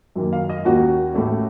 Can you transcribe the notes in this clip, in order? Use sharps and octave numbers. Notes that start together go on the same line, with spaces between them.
F#2 D#3 A#3
F5
D#5
D#2 D#3 A#3 C#4 F#4
A1 A2 A3 C#4